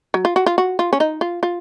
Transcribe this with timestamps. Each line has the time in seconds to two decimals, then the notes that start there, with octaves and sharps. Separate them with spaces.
0.14 F#3
0.25 F4
0.36 F#4
0.46 F4
0.58 F#4
0.79 F4
0.93 C#4
1.00 D#4
1.21 F4
1.43 F4